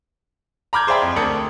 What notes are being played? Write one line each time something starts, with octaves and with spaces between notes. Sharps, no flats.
A#5 B5 D6 F6 G6 G#6
G#4 C5 D5 E5 G5 B5
F2
D2 C4 D4 A#4 D#6 C#7